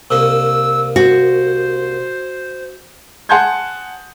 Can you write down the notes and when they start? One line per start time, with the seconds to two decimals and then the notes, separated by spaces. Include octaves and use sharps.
0.11 C2 A#3 D#5 E6
0.96 F#4 C5
3.29 F#5 G#5 A5 C6 G6 G#6